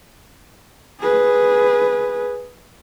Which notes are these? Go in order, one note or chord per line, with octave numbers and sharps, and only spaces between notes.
G#4 B4